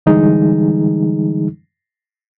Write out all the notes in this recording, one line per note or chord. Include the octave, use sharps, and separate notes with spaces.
D3 E3 G3 G#3 D#4 G#4